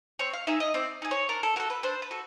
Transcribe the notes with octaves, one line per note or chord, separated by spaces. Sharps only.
C4 C#5
F5
D#4 G#4 E5
D#5
C4 D5
D#4 G#4
C#5
D4 A#4
A4
F#4 A4 A#4
B4
D4 C5
B4
F#4 A4